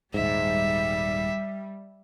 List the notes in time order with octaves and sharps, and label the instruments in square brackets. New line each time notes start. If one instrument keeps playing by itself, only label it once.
[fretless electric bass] D#1 G#2 [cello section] G3 [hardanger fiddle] E5